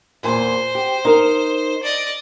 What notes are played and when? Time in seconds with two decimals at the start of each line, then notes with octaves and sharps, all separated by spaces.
0.23 E2 A#2 C5 G#5
0.75 G4
1.05 D#4 A#4
1.83 D5 D#5